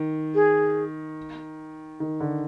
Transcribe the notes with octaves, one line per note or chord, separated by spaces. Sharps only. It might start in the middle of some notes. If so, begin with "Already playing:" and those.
Already playing: D#3
G#4
D#3
D3